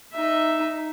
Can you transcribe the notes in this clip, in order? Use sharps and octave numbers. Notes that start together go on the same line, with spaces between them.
D#4 E5